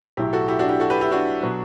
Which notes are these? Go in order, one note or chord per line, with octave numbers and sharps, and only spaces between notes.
B1 A2 F#3 E4 G4
F#4 A4
E4 G4
D4 F#4
E4 G4
F#4 A4
G4 B4
E4 G4
D4 F#4
B2 F#3